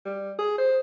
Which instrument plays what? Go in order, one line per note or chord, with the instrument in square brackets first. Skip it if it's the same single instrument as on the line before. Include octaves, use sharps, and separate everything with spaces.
[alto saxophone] G3
G#4
C5